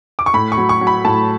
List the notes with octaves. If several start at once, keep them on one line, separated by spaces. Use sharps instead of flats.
D6
C#6
A2 B5
C#6
F#3
C#6
F#3
B5
A2 A5